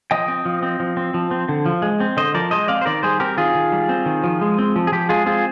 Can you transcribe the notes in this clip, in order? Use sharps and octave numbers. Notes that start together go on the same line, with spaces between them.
F3 D#5 G5
C4
F3
C4
F3
C4
F3
C4
D3
F3
G#3
C4
D3 C5 D#5
F3 A#4 D5
G#3 C5 D#5
C4 D5 F5
C5
D#3 A#4 D5
G3 G#4 C5
C4 G4 A#4
D#3 F4 G#4
D#3
G3
C4
D#3
F3
G#3
C4
F3
G#4
F3 G4
G#3 F4 G#4
C4 F4 G#4